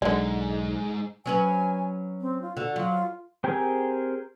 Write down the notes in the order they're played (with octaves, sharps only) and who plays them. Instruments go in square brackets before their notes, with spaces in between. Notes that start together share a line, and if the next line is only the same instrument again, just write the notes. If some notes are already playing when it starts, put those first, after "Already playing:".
[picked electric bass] B1 [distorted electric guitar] G#2 [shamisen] D3 G#3 [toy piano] D5
[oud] F#3 C#4 B4 [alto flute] G#5
[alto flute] C4
F4
[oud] D3 [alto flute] F#4
[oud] F#3 [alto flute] F4
[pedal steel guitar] C4 G4 G#4 A#4 G#5